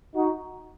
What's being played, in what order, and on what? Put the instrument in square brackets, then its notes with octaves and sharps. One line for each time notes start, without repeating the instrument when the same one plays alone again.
[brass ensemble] D#4 F#4